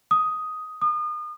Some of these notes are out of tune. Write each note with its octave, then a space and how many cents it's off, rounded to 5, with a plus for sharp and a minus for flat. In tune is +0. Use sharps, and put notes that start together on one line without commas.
D#6 +5
D#6 -35